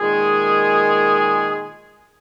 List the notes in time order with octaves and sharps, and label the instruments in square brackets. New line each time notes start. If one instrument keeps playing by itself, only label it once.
[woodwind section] A#2 D#3 G#3 G#4